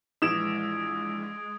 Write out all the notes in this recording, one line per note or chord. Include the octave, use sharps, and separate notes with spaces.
A#1 E3 G#3 D#6 G#6 D7 E7